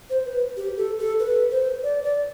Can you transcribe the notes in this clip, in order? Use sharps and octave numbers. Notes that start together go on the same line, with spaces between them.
C5
B4
G4
A4
A4
B4
C5
D5
D5